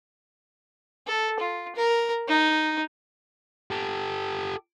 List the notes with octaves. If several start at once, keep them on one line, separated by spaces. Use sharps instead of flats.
A4
F4
A#4
D#4
G4 A4